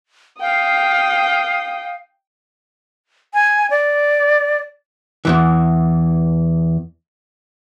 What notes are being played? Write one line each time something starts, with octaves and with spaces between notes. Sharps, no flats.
F5 G5 D#6
G#5
D5
E2 G2 E3